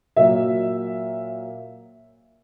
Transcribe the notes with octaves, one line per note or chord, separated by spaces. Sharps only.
A#2 F#3 A#3 E5